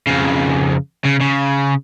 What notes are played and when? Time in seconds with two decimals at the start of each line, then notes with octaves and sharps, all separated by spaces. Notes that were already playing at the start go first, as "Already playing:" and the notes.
0.07 F2 C#3
1.04 C#3
1.21 C#3